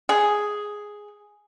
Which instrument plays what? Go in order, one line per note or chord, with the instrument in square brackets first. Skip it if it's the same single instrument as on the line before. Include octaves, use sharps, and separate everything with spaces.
[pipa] G#4